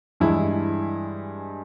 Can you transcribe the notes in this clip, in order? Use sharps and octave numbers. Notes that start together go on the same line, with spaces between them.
G2 E3 G#3 E4